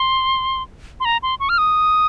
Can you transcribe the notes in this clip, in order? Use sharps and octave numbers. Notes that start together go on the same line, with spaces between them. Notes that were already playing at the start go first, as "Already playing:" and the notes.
Already playing: C6
C6
A#5
C6
C#6
F6
D#6